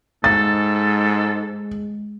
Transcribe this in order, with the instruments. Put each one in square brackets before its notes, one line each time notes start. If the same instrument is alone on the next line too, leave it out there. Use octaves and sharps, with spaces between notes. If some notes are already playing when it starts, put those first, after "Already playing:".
[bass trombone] G#2 [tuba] G#3 [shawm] A4 [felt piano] A6